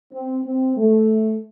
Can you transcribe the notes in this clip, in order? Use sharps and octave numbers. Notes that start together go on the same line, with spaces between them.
C4
C4
A3